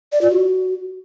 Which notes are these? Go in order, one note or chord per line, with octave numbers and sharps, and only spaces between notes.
D5
F4
F#4